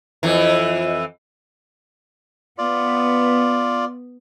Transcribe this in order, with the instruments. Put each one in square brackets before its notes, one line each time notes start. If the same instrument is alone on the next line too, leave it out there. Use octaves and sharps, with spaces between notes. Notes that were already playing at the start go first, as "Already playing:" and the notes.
[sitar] F2 E3
[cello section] B3 [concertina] F4 D5